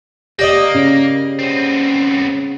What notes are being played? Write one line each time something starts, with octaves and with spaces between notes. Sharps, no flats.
A#3 G4 D5 D#5
C#3
B3 C4